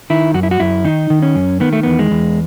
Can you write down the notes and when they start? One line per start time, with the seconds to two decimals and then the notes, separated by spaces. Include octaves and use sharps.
0.10 D#3 E4
0.34 F#2 F#4
0.43 E4
0.51 F#4
0.60 F#2 E4
0.84 D#3 D#4
1.10 D#3
1.22 C#4
1.35 F#2
1.60 D#3 B3
1.73 A3
1.83 E2 B3
1.99 G#3
2.11 E2